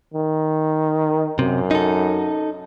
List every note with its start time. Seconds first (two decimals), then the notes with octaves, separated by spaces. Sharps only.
0.14 D#3
1.39 F#2 C3
1.71 D#4 A4